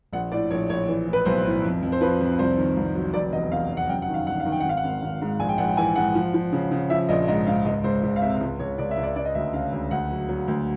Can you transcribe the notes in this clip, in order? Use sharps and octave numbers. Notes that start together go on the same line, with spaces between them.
A#1 F#5
A2 D5
A#1 C#5
A#1 C#5
E3
A2
B4
B1 C5
A2
F2
F2
C5
F3 B4
F2
C2 C5
D#3
C2
F#3
F1 D5
E2 D#5
E2 F5
F1
F#5
F#2 G5
F#5
D#3
F5
G1 F#5
F5
D#3
G5
F#5
G#1 F5
F#5
G#1
G#1
G#2
A#1 G#5
G5
A#1 F#5
G5
E3 G#5
G#2 F#5
F3
F3
C#3
C#3
F3 E5
A#1 D#5
G#2 D#5
G#2 F5
C#2 D#5
C#2 C5
C#2
F5
C3 E5
C#2
C#2 C#5
C#2 D5
E5
C#2
D5
C#3 D5
D#5
D2 E5
C#3 F5
D2
D2 F#5
F#3
F#3
D2